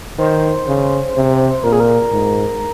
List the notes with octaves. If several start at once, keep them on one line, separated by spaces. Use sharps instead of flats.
D#3 C5
C#3
C3
A#2 A#4
G#4
A#4
G#2